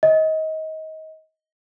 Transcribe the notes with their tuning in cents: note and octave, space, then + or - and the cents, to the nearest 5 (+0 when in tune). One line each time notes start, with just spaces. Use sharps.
D#5 +25